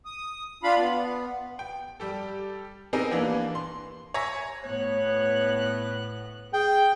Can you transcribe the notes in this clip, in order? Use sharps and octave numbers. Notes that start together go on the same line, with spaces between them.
D#6
D4 F4 F5 B5
B3
G5
G3 G4 A4
B3 C4 D#4 G4 G#4 A#4
E3 A#3 B3 D4
C6
C#5 E5 G#5 A#5 G#6 A#6
A2 B3 C#5 F#6
G#4 G5